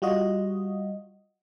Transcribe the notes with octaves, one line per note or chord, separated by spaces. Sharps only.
G3 F4 F#4 D#5